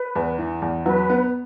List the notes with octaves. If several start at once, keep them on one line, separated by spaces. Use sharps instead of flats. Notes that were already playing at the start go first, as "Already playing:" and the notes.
Already playing: B4
E2
E3
E2
F#3 B4
B3